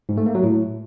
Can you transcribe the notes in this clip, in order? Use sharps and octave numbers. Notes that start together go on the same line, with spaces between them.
G#2
A3
A#3
F#3
A2